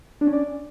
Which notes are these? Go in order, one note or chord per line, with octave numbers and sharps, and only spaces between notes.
D4
C#4
D5